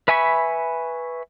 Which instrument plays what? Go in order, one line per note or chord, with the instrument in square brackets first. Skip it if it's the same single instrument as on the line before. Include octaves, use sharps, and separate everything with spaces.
[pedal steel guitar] B4 E5 G#5 B5 C#6